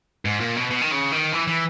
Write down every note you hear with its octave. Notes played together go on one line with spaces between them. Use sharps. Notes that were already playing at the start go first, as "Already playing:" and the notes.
G#2
A#2
B2
B2
D#3
C#3
D#3
E3
E3